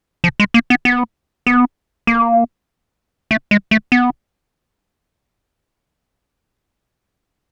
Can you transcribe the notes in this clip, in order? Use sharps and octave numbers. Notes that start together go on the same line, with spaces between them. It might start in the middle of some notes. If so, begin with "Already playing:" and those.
F3
G#3
A#3
B3
B3
B3
A#3
A3
G#3
A3
B3